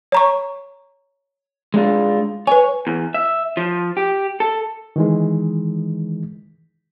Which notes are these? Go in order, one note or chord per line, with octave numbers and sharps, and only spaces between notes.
C#5 A#5 C#6
G#3 D4 F4
B4 C#5 G#5
E2
E5
F3
G4
A4
D#3 E3 G#3